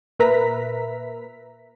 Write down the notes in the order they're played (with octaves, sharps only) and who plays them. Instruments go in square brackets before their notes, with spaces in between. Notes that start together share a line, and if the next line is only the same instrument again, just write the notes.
[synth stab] A#2 A#4 B4 E5 A#5 B6